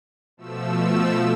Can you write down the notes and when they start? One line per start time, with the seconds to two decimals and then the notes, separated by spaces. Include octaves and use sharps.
0.37 B2 F3 A3 E6